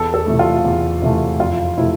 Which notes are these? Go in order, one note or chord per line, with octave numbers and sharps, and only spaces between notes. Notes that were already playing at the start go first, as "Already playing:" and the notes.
Already playing: E2 A4
A4
C3 E3 A3
F4
E2
C3 E3 A3
F2 F4
C3 F3 A3 E4